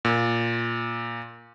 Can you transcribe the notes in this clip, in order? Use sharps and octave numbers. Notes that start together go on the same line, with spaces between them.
A#2